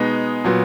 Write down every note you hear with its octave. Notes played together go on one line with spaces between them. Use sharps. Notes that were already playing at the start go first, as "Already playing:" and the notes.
Already playing: B2 G#3 B3 D#4
A#2 F#3 B3